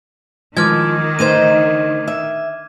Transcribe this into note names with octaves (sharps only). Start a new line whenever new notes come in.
D#3 F3 G#3 D6 F6 G#6
D2 D#4 C5 G#6 D#7
E5